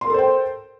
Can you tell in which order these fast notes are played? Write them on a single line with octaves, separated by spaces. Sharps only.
C6 A#4 A4 C5 G5